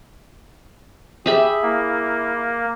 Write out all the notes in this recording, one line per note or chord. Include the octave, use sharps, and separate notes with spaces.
G4 G#4 E5 B5
A#3 E4